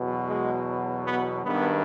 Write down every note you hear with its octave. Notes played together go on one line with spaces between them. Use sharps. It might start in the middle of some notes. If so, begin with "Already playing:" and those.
Already playing: E2 B2 F#3
G#3
B3
G#1 G2 D#3 B3